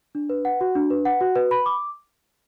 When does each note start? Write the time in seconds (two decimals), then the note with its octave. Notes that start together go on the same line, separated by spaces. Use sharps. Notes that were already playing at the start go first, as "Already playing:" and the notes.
0.15 D4
0.30 B4
0.45 F#5
0.61 F#4
0.75 D4
0.90 B4
1.05 F#5
1.21 F#4
1.36 B4
1.51 B5
1.66 D6